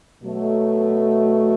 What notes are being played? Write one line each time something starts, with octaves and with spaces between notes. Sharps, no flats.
B2 F#3 A3